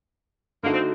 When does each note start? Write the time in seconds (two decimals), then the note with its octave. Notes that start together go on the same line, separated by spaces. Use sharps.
0.63 D3 A3 A#3 D#4 F#4 A4
0.74 C4